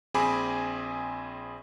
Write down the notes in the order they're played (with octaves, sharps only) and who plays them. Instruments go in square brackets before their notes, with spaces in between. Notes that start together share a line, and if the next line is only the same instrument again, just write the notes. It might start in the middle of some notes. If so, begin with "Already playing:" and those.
[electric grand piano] A#1 C4 G#4 G#5 B5 D6